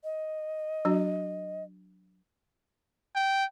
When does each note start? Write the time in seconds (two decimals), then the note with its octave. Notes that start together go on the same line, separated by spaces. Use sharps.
0.04 D#5
0.85 F#3 D4 F#4
3.16 G5